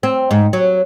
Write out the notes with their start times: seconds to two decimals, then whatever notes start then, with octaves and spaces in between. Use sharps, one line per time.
0.03 C4
0.31 G#2
0.53 F#3